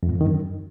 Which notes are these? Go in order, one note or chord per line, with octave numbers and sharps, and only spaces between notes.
F2
G#2
F2
D#3
F#2